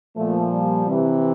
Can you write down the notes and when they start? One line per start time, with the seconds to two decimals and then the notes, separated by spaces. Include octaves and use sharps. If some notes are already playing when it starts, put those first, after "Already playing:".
0.16 A#2 F3 A3
0.51 G3
0.86 C3 E3